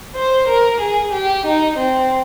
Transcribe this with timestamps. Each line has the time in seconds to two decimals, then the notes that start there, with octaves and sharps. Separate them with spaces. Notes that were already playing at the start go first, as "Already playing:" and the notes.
0.16 C5
0.47 A#4
0.80 G#4
1.12 G4
1.45 D#4
1.78 C4